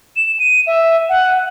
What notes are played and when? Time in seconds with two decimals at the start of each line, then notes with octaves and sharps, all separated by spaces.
0.16 E7
0.39 D#7
0.67 E5
1.09 F#5